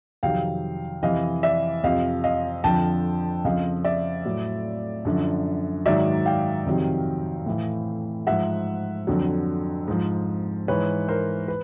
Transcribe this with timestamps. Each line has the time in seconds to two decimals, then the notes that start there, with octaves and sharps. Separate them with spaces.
0.23 F2 C3 D#3 F#3 F5 G5
1.03 F2 C3 E3 D#5 F5
1.43 D5 E5
1.84 F2 C3 F3 D#5 F5
2.24 D#5 F5
2.64 F2 D3 F3 G5 A5
3.44 F2 C#3 F3 D#5 F5
3.84 D5 E5
4.25 A2 F#3
5.05 F#2 D3 F3
5.86 G#2 D#3 F#3 D5 E5
6.26 F5 G5
6.66 F2 C3 D#3 F#3
7.46 A2 E3
8.27 G#2 F3 E5 F#5
9.07 F2 D3 F#3
9.88 G#2 F3
10.68 G#2 E3 B4 C#5
11.09 A#4 C5
11.48 B4